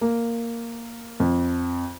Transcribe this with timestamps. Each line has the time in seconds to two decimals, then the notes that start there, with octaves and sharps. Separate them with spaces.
0.01 A#3
1.20 F2